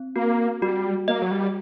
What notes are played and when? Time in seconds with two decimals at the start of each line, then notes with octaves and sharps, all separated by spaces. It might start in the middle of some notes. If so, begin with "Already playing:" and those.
Already playing: C4
0.16 A#3 F#4
0.62 G3 F#4
1.08 A#3 D#5
1.22 F#3
1.31 G3